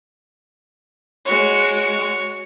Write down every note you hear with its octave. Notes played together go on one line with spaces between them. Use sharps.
G#3 F#4 C#5